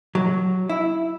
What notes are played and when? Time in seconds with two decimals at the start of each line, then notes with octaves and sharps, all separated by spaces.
0.15 F#3
0.69 E4